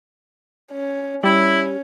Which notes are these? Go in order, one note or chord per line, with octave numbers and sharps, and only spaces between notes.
C#4
G3 C#4 E4